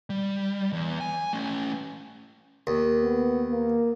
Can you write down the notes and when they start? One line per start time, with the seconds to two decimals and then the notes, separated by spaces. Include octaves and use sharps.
0.10 G3
0.73 E2
1.01 G#5
1.33 A3 C#4
2.67 D#2
3.02 B3
3.51 A#3